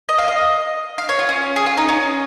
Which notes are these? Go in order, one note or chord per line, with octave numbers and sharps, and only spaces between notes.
D#5
F5
D#5
F5
C#5
F4
C#4
G#4
F4
D#4
C#4